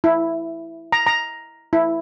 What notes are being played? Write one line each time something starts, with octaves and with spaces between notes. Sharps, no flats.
E4
A#5
A#5
E4